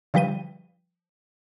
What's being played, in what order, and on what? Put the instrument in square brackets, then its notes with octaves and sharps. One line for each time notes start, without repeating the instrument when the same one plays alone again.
[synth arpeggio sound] D3 F3 G3 B4 G5 D#7